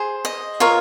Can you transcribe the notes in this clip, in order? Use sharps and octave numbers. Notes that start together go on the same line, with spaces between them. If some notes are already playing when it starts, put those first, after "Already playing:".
Already playing: G#4 C5
D#5
F4 A#4 C#5